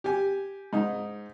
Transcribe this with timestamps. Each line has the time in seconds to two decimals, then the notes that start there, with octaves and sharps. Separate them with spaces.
0.04 G4 G#5
0.73 G#2 D#4